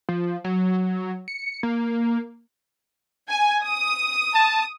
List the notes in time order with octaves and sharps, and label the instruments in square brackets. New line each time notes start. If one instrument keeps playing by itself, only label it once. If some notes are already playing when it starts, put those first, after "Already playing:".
[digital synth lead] F3
F#3
C#7
A#3
[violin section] G#5
D#6
[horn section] A5